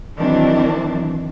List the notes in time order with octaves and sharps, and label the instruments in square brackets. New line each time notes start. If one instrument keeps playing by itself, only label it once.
[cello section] D#3 E3 F#3 C4 D4